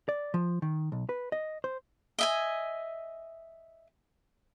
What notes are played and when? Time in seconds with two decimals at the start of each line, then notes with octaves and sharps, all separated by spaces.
0.09 D5
0.34 F3
0.62 D#3
0.92 B1
1.09 B4
1.32 D#5
1.64 C5
2.18 D#5 E5 G#5